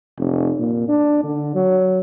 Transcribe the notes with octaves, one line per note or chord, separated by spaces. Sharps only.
F1
A#2
D4
D3
F#3